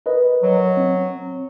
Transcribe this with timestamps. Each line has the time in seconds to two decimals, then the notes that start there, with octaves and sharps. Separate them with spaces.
0.06 A#4 B4 D#5
0.43 F#3
0.77 C4